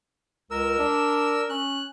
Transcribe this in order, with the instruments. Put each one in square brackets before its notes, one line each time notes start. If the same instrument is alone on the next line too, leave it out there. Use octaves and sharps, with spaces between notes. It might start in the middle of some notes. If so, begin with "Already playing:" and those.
[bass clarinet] C#2 [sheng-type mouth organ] A#4 E6
[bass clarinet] D4
[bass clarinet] C#4 [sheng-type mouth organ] F#6